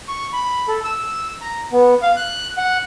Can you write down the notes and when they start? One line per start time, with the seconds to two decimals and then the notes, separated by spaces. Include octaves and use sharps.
0.08 C#6
0.33 B5
0.68 A4
0.84 E6
1.41 A#5
1.72 B3
2.02 F5
2.17 F#6
2.57 F#5